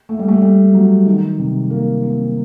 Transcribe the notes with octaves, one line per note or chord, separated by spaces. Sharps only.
A3
G3
A3
G3
F#3
D#3
C3
A#3
C4